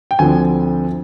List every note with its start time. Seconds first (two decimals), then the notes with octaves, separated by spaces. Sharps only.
0.11 G5
0.19 D2 D3 F3 C4 G#5